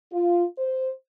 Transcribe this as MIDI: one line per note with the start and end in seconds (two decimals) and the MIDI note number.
0.13 0.44 65
0.58 0.89 72